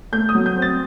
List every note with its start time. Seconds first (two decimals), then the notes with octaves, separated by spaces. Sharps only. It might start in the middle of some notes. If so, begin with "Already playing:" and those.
0.12 A3 G6
0.29 D#6
0.35 F#3
0.46 G6
0.57 C4
0.62 A6